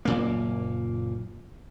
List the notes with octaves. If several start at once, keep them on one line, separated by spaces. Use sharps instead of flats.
F#1 A#2 A#3